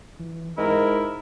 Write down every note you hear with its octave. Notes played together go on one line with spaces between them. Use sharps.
E3
G#2 E4 A#4 D#5